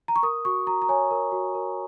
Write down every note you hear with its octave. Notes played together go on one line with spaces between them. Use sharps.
A#5
C#6
A#4 D#6
F#4 C#6
F#4 A#5
A#5
C#5 G#5
A#4
F#4
A#4